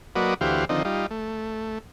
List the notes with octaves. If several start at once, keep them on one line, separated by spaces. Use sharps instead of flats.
F#3 A#3 F#4 B4 D5 D#5
D2 E3 F#4 G4 C5 F5
D3 D#3 F3 C4 D#4
G3 D#4 F4
A3